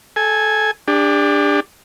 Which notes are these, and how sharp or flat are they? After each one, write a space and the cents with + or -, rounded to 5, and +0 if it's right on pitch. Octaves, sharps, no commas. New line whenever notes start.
A4 -20 G#5 +0
D4 +0 G4 +45